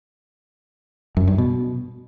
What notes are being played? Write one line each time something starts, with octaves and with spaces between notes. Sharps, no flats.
F#2
G2
B2